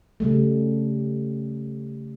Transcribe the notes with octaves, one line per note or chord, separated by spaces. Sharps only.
C#3 G3 A3